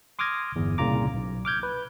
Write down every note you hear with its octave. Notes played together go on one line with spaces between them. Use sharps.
C6 D6 D#6 F6 G#6 A#6
G1 E2
C2 A#2 C#3 F4 A#5 D6
B1
D6 F6 G6 G#6
B4